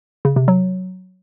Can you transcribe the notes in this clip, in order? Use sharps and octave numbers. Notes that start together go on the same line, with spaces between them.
C#3
C3
F#3